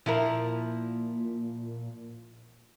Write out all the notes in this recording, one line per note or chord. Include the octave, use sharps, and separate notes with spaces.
A#2 F3 E4 A#4